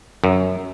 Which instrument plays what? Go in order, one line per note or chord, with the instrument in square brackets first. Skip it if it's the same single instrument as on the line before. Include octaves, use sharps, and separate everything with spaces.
[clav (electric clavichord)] F#2